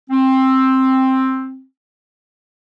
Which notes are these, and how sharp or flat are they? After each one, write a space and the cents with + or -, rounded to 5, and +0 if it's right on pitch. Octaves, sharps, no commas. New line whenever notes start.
C4 +10